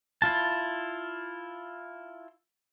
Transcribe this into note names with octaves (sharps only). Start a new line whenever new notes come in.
E4 F4 A5